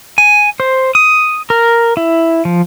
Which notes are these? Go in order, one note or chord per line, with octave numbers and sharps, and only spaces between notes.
G#5
C5
D#6
A#4
E4
F3